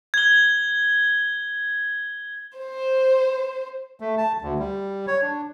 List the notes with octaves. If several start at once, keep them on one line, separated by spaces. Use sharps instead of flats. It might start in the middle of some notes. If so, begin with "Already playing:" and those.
G#6 G7
C5
A3
A5
D2
G3
C#5
D4